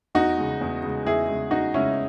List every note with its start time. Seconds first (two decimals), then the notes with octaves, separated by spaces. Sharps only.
0.15 E2 D#4 F#4
0.38 C#3 G#3
0.61 E2
0.83 C#3 G#3
1.06 E2 E4 G#4
1.29 C#3 G#3
1.51 E2 D#4 F#4
1.74 C#3 G#3 C#4 E4